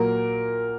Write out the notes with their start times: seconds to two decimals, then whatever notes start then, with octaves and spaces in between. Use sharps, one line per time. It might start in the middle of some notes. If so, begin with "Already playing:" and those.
Already playing: A#2 F#3 A#3 A#4